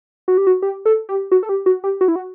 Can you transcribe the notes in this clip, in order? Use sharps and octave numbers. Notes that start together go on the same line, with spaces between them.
F#4
G4
F#4
G4
A4
G4
F#4
A4
G4
F#4
G4
F#4
E4
F#4